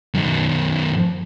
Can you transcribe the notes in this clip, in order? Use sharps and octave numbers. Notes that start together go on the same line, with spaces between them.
F#2 D#3